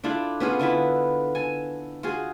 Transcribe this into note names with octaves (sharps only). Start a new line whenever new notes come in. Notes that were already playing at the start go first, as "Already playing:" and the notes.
D4 E4 F4 A4
B3 C#4 F4 G#4
D3 E4 F4 B4
A4 G#5
F4 F#4 G#4